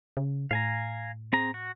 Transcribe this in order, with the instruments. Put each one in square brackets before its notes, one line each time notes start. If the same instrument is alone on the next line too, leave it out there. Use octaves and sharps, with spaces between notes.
[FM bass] C#3
[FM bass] A2 [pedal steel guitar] F5 G#5 A#5
[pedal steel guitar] C4 G#4 A#5
F#4